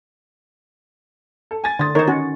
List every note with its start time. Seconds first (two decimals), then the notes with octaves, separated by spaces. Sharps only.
1.51 A4
1.64 G#5 A6
1.79 D3 C6 D#6 A6
1.95 D#3 D#4 A#4 C5 C#5
2.07 C#4 F#4